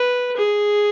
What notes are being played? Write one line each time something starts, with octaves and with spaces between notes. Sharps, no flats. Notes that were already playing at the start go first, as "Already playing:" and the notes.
Already playing: B4
G#4